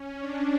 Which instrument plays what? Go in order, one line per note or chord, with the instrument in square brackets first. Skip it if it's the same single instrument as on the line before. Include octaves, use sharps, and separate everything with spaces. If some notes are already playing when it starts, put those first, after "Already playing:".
Already playing: [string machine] C#4
D4